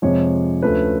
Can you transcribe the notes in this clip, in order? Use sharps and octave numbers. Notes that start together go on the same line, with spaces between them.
F2 C3 F3 G#3 C#5
D2 D3 F3 A3 C#4 B4